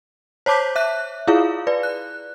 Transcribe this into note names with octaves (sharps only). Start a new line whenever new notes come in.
C5 C#5 A5 D6 G6 B6
E5 F#6
E4 F4 G#4 F5
B4 D5
F#6